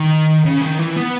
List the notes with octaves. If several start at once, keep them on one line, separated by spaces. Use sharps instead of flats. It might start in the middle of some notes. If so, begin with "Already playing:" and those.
Already playing: D#3
C#3
D#3
E3
B3